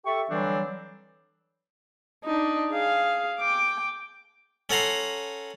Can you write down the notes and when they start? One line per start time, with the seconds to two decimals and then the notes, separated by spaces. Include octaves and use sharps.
0.05 G4 A4 E5 C#6
0.30 D3 E3 F#3 G3 C4 D4
2.24 D4 D#4
2.72 G#4 F5
3.39 G5 D6
4.70 C#4 A4 F#5 A#5 C6